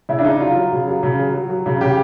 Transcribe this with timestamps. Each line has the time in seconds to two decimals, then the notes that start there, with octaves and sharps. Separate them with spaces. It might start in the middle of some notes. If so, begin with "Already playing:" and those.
0.09 C#3 E4
0.19 D4
0.24 C#3 D#4
0.40 F#3 F4
0.56 F#3
0.72 C#3
0.88 F#3
1.03 C#3
1.19 F#3
1.34 F#3
1.50 F#3
1.66 C#3
1.81 C#3 G4